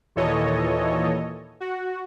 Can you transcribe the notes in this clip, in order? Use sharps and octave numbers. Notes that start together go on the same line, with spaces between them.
D#2 A#2 E3 A4 C#5 D#5
F#4